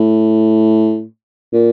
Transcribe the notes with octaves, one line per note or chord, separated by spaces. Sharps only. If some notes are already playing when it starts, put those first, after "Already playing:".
Already playing: A2
A#2